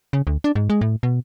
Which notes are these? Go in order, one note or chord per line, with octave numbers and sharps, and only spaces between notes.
C#3
D2
D4
G#2
G#3
A2
B2